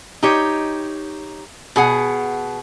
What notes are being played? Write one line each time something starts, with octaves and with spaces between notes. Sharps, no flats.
D#4 G4 C#5
B2 G#4 F#5